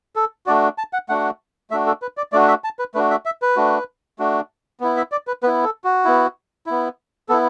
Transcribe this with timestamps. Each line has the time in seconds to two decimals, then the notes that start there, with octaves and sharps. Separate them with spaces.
0.16 A4
0.46 A3 D4 F#4 D5
0.78 A5
0.93 F#5
1.09 A3 D4 F#4 F#5
1.70 A3 D4 F#4 E5
1.87 A4
2.02 B4
2.17 D5
2.32 A3 D4 F#4 D5
2.48 E5
2.64 A5
2.79 B4
2.94 A3 D4 F#4 B4
3.11 E5
3.26 E5
3.42 B4
3.57 A3 D4 F#4
4.19 A3 D4 F#4
4.80 B3 E4
4.97 E5
5.12 D5
5.27 B4
5.43 B3 E4 B4
5.64 A4
5.84 F#4
6.05 B3 E4
6.66 B3 E4
7.29 B3 E4 A4